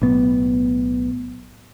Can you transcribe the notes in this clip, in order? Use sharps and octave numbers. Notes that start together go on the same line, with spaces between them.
B1 A2 B3